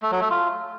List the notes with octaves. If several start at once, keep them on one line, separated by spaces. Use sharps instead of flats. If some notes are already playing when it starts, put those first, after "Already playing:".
A3
F#3
A3
F4